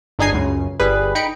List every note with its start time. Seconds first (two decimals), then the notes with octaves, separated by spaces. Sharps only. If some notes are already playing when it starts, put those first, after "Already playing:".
0.19 G1 D4 D#4 G#4 G#5 C7
0.32 C#2 F#2 C#3
0.80 G1 G3 G#4 B4
1.15 D#4 G5 B5 C#7 D7